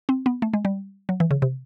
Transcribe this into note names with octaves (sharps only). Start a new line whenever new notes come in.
C4
B3
A3
G#3
G3
F#3
E3
C#3
C3